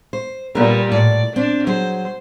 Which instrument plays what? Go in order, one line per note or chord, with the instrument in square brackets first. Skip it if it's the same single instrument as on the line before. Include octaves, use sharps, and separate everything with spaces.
[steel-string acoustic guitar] C5
[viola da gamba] A#2 G3 [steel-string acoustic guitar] A#4 B4
[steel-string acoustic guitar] A2 [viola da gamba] D5
[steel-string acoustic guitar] C4 [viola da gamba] D4
[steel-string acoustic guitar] F#3 G#4 [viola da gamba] C5